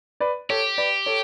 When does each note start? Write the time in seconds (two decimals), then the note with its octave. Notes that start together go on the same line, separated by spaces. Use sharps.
0.20 B4 D5
0.50 G4 A4 C#5
0.78 B4 D5
1.06 A4 C#5